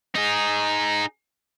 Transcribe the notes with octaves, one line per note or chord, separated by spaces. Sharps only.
D#4 G#4